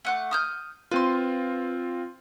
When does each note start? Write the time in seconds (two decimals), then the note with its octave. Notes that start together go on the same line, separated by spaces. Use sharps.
0.05 A3 F#5 D6
0.31 D#6 F6 G6
0.91 C4 F4 B4 C6